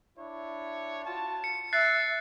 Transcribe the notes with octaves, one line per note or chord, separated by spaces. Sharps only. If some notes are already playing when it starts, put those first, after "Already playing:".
D4 E4 C#5
F4 F#4 A5
C#7
E5 F#6 A6 C7